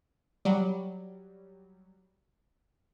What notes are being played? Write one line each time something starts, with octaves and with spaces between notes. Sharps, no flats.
F#3 G3